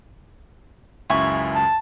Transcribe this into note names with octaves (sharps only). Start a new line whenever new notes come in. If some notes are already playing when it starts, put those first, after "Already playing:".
C#2 F#2 E4 G#5 C#6
A5